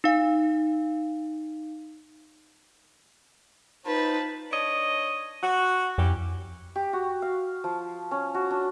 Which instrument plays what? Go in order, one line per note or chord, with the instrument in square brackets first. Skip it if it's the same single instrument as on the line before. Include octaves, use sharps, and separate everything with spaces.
[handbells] D#4 F5
[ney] D#4 [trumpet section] F4 C5 A5 [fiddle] B4
[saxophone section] D4 C#5 D#5
F#4
[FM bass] F2 [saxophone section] C#4 E4 G4
[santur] G4
F#4
F5
F3
C#4
F#4
D4